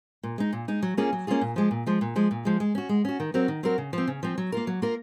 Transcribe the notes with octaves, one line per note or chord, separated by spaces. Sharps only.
A#2
G#3 D#4
A#2
G#3 D#4
F#3
A#3 C#4 F4 G#4
F#3
A#3 C#4 F4 G#4
A#2
F3 G#3
A#2
F3 G#3
A#2
F3 G#3
A#2
F3 G#3
G#3
C#4 F#4
G#3
C#4 F#4
D#3
F#3 C4 F#4 A#4
D#3
F#3 C4 F#4 A#4
C#3
F3 C4
C#3
F3 C4
F#3
A#3 F4 A#4
F#3
A#3 F4 A#4